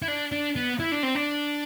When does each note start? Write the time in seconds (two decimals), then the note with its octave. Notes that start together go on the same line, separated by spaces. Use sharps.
0.02 E4
0.08 D4
0.32 D4
0.56 B3
0.80 E4
0.92 D4
1.03 C4
1.15 D4